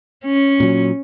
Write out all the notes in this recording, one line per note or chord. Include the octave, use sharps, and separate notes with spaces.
C#4
A#2 F#3